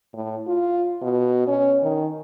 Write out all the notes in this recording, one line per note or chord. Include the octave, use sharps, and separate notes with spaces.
A2
F4
B2
C#4
D#3